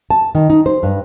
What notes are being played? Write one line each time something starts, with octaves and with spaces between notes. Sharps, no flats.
A5
D#3
D#4
C5
G2